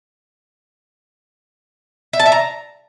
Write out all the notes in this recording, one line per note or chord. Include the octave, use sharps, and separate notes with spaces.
E5
A5
E5
A#5